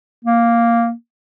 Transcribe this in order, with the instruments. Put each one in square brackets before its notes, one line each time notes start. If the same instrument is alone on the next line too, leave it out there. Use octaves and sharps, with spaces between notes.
[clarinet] A#3